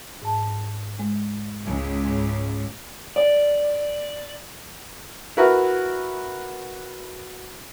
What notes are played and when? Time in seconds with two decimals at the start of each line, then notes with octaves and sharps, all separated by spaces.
0.22 G#2 A5
0.99 G#3
1.65 C#2
2.05 G#2
3.16 D5
5.37 E4 F#4 A#4 B4 E5